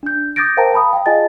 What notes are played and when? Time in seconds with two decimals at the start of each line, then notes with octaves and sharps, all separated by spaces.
0.03 D4 G6
0.36 D6 D#6 G6 A6 A#6 D7
0.57 A#4 C5 F5 G5 A5 A#5
0.72 F5 A5 B5 D#6
0.93 F5 G5
1.06 F4 G#4 D#5 G#5 A5 A6